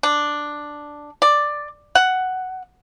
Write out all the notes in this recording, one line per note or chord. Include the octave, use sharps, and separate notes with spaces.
D4
D5
F#5